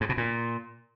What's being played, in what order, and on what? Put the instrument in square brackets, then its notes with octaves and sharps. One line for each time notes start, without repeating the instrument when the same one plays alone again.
[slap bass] G#2
B2
A#2